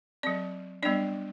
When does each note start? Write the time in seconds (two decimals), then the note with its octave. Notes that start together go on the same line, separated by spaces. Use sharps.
0.23 F#3 C4 D5
0.83 G3 B3 D4 D5